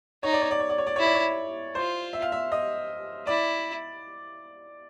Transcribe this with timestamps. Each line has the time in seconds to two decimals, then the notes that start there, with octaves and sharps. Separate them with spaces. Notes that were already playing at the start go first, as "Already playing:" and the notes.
0.23 D#4 C#5
0.33 D5
0.41 C#5
0.51 D5
0.59 C#5
0.69 D5
0.78 C#5
0.87 D5
0.96 E4 C#5
1.05 D5
1.14 C#5
1.75 F4 C5
2.13 E5
2.22 F5
2.32 E5
2.52 D#5
3.27 E4 D5